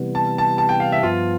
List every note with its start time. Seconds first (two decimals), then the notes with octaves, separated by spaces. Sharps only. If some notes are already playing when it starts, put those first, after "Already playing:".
Already playing: C3 E3 G3 B3
0.15 A5
0.38 A5
0.58 A5
0.69 G5
0.80 F5
0.92 E5
1.03 G2 F3 B3 F4